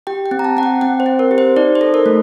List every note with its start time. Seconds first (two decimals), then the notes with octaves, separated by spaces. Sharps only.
0.07 G4 G5
0.26 G5
0.31 C4
0.39 A#5
0.44 A5
0.57 C4 F#5
0.63 G5
0.81 C4 G5
1.00 C5
1.06 C4
1.19 A#4
1.31 G4
1.38 C5
1.56 D#4 D5
1.75 C5
1.81 A4
1.94 A#4
2.06 A3